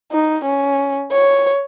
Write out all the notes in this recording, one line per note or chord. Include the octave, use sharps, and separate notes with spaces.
D#4
C#4
C#5